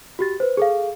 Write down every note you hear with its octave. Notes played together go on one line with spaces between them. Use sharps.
F#4 G4 A6
B4 C5
G#4 A4 F5